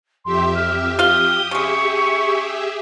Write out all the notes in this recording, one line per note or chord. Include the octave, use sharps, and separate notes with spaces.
F2 G4 E5 C6
F6
F4 G4 F5 D#6 G7
C#3 G#3 G4 G#4 E5 C#6